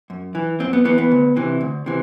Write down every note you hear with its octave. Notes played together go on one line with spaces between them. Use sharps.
F#2
E3
F#2 C4
B3
E3 B3
B3
D2
C3 E3
D2
C3 E3